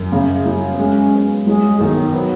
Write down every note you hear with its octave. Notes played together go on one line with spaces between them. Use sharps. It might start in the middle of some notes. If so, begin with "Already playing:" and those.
Already playing: F#2
C#3
F#3
B3
G#3 C#4
B3
F#3 G#3
B1 D#3
F#3 B3